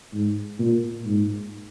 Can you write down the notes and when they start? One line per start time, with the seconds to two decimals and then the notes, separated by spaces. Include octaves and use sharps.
0.13 G#2
0.59 A#2
1.06 G#2